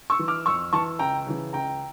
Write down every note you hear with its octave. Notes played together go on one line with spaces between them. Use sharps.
C#6 E6
E3
D6 F6
F2 C#6 E6
E3 A5 C#6
C#2 G5 A#5
C#3 E3
C#2 G5 A#5